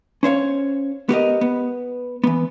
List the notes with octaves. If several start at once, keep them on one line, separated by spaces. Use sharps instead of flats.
C#4 C5 C#5 F5
B3 G4 A#4 D#5
B3
E3 B3